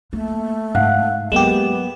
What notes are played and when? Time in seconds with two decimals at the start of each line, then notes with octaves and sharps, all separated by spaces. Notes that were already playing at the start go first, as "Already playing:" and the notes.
0.13 A3 A#3
0.75 G#2 F5 F#5 F#6
1.32 F#3 G#3 A#3 B3 G4 E7